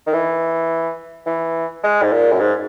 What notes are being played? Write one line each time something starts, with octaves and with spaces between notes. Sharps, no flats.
D#3
E3
E3
G#3
G#2
A#2
F#2
G#2